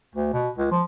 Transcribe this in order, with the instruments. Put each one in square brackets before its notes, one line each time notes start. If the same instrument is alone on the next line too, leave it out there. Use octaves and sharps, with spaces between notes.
[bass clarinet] D2
B2
C#2
F3